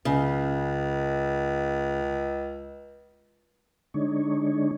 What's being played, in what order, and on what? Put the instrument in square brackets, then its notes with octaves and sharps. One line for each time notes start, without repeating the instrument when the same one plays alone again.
[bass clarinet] C#2 [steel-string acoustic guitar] C#3
[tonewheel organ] D3 G#3 D4 D#4 C#5